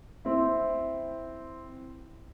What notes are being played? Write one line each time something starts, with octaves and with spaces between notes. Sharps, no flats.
C4 E4